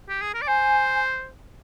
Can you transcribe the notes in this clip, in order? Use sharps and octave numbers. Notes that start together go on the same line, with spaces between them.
G4
G#4
A#4
D5
C5 G#5